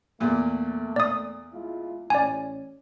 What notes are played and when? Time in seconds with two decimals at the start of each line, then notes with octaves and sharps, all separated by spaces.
0.20 E2 A#2 A3 A#3
0.96 D5 D#6
1.53 G#3 E4 F4
2.10 A1 C#4 D5 G#5